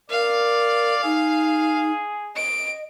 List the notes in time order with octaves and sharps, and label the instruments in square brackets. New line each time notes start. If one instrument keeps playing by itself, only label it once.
[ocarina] A#4 [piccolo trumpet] D5 [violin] F5
[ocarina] D#4 [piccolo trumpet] G#4
[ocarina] D#5 [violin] D7